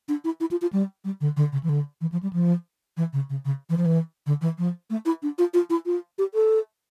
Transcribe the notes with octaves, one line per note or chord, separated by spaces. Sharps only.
D4
E4
E4
F4
F4
G3
G3
D3
D3
C#3
E3
D3
E3
F3
G3
F3
E3
C#3
C#3
C#3
E3
F3
E3
D3
E3
F3
A3
E4
D4
F4
F4
E4
F4
G4
A4